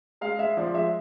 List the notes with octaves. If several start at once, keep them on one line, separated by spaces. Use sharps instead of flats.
G#3 F5
G#3 E5
F3 D5
G#3 E5